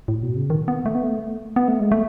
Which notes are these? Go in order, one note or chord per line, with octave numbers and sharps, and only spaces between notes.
A2
B2
C#3
D#3
B3
A3
B3
A3
B3
A3
G#3
A3